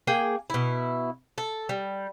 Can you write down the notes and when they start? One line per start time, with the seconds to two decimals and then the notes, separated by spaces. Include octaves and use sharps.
0.07 A#3 G#4 G5
0.50 B2 E4
1.38 A4
1.69 G3